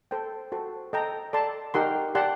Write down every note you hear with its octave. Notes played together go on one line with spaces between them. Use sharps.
A4 C5 G5
F#4 A4 C5
A4 D#5 G5 A#5
A4 D5 A5 C6
D#4 G4 A#4 F#5 C6
G4 D5 F#5 A5 C6